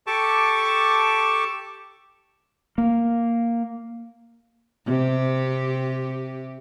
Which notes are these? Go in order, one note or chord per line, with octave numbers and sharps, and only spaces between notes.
G4 A4 A5 C#6 D6
A#3
C3 G4